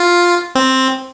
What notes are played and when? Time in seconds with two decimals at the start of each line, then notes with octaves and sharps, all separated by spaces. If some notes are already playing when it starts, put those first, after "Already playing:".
Already playing: F4
0.55 C4